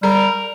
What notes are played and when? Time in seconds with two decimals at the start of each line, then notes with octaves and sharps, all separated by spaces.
0.03 G3 A#4